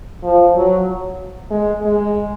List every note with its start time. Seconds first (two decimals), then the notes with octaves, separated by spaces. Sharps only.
0.23 F3
0.55 F#3
1.50 G#3
1.82 G#3